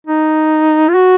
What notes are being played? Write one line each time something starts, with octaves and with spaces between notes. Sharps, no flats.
D#4
F4
F#4